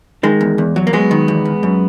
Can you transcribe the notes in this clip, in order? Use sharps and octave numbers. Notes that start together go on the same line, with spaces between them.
D#3 G#3
E2
E2
F#3
A#3
F#3 G#3 B3
D#3
E2
E2
F#2